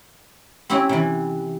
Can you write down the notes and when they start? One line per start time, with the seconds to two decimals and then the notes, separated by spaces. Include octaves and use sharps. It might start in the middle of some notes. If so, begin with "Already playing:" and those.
0.70 C4 C#4 E4 G4
0.89 C3 E3